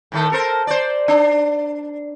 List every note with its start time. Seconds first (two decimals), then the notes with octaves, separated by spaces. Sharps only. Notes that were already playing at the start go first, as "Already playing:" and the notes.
0.12 A2 D#3 A3
0.32 A4 A#4 C5
0.67 C5 D5
1.08 D4